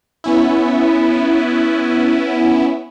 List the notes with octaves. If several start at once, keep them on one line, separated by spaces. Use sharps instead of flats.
B3 C#4 E4